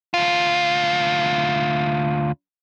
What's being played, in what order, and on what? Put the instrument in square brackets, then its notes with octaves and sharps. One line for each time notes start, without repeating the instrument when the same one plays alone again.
[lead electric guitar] D2 F4